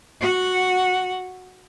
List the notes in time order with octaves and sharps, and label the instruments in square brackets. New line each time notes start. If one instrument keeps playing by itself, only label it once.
[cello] F#4 F#5